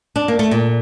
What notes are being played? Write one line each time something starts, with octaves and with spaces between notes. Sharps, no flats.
D4
A#3
A3
A#2